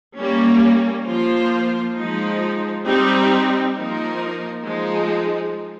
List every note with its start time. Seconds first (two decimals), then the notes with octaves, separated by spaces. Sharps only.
0.18 G3 A#3 C#4
1.08 F3 A#3 F4 C5
1.97 F3 G#3 D#4
2.86 G3 C4 D#4 G4
3.75 F3 A#3 D#4 A#4
4.64 F3 G#3 D#4